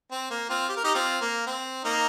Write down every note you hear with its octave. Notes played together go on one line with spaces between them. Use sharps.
C4
A#3
C4 F4
G4
A#4
D#4 G4
C4 F4
A#3
C4
A#3 D#4